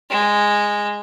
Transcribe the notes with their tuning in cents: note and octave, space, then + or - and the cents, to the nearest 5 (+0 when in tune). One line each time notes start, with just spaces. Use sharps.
G#3 -10